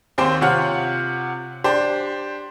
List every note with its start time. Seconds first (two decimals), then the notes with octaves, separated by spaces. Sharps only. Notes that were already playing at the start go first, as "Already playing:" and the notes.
0.18 D#2 C4 G4 C5 G5 C6
0.41 C3 F4 C#5 F#5 F6
1.64 D4 G4 C5